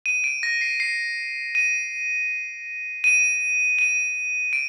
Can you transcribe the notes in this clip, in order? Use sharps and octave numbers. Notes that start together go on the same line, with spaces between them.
D#7
D7
A#6
C7
C7
D#7
D#7
D#7
D7